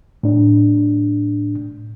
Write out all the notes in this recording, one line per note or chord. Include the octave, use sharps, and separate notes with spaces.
A2 D4